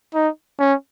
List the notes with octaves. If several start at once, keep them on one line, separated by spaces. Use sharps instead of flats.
D#4
C#4